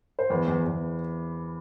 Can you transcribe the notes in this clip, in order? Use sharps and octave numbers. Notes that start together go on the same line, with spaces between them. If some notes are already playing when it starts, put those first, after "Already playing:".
C5
E2 B4
E2
E2